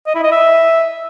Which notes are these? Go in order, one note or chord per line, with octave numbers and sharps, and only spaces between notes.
D#5
E4
D#5
E5